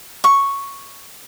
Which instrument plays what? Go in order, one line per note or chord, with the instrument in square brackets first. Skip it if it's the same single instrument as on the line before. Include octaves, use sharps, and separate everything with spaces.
[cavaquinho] C#6